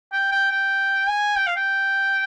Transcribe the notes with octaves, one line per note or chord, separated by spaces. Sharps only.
G5
G5
G5
G#5
G5
F5
G5